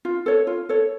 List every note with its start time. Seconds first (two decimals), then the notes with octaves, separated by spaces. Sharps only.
0.05 F4
0.26 A4 C#5
0.47 F4
0.69 A4 C#5